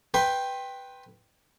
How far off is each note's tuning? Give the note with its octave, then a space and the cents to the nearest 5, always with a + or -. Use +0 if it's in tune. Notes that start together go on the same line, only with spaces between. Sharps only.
B4 +5 G5 +0 C6 +25